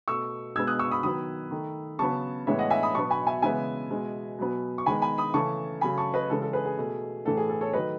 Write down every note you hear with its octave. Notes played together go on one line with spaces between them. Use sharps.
B2 A3 C#6 E6
B2 G#3 B3 E6 G#6
D#6 F#6
C#6 E6
B5 D#6
D#3 F#3 B3 B5 D#6
D#3 A3
C#3 F#3 B3 A5 C#6
A2 E3 G#3 B3 C#5 E5
D#5 F#5
E5 G#5
B5 D#6
B2 F#3 B3 A5 C#6
G#5 B5
E5 G#5
C#3 E3 G#3 B3 E5 G#5
B2 G#3 B3
B2 F#3 B3
C#6
D#3 G#3 B3 G#5 B5
G#5 B5
B5 D#6
C#3 E3 A3 A5 C#6
C#3 F#3 A3 G#5 B5
A5 C#6
B4 D#5
C#3 E3 G#3 A4
A4
G#4 B4
G#4
B2 A3
A2 E3 A3 A4
G#4
A4
A4 C#5
D#3 F#3 A3 B4 D#5